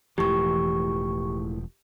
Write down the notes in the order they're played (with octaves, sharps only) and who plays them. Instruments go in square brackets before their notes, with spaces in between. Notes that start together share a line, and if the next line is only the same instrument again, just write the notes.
[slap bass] E1 C2 F3 [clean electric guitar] A2 E3 [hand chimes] G4 C#6